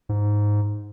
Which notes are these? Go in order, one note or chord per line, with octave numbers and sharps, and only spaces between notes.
G#2